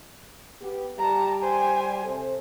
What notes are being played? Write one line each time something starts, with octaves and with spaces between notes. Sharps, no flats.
B3 G4
G3 G4 A5 A#5
C5 G#5
C3 A4 C5